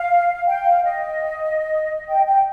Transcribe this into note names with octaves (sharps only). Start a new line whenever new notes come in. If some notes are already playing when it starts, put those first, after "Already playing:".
Already playing: F5
G5
F5
D#5
G5
G5